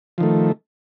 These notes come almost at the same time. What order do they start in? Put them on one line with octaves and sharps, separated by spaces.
F3 D#3 A3